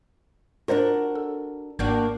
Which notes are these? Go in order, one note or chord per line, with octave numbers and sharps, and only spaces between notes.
D4 F4 F#4 A#4 C5 D5
A4
G#1 G#2 A#3 D4 F#4 G6